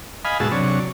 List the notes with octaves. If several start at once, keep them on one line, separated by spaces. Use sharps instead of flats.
D#5 F5 G#5 B5
G#2 B2 F#4 G#4 A5 E6
C3 F#3 D4 C#5